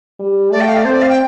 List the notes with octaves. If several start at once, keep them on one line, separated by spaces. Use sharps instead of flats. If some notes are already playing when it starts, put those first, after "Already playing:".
G3
A3 D5
G5
F5
D5
C4 C5
D5
F5
G5